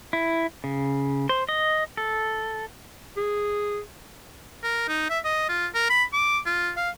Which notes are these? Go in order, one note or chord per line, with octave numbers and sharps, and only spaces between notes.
E4
C#3
C5
D#5
A4
G#4
A#4
D#4
E5
D#5
F4
A#4
B5
D6
F4
F5